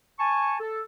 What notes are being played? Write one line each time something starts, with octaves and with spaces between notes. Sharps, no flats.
G#5 A5 C#6
A4